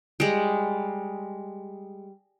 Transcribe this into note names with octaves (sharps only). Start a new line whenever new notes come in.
G3 G#3